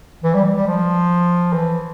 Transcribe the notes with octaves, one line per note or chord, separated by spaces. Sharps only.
E3
G3
G3
G3
F3
E3